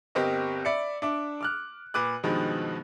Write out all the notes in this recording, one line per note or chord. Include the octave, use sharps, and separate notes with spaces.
G1 C4 G4 A#4 D#5
D5 E5 B5 C#7
D4 E5 D6
D6 F6 F#6
A#2 B4 D6 F#6
G2 B2 D#3 F3 G#3 B3